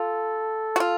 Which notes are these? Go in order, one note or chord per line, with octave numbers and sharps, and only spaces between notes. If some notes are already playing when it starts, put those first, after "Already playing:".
Already playing: F4 A4
F#4
F4